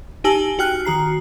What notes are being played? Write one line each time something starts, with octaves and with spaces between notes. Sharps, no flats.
D#4 G4 G#5 A5 E6 F#7
F#4 G5 F6 F#6
D#3 F#4 A#5 C7